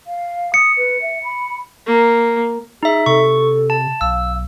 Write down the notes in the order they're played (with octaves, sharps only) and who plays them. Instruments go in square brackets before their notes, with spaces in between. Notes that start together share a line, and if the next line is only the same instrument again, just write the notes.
[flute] F5
[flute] D#6 [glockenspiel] C#7
[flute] B4
E5
B5
[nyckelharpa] A#3
[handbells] D#4 E5 [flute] G#4
[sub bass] C3 [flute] A4 [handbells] C#6
[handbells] A5
[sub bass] B1 [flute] F5 [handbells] E6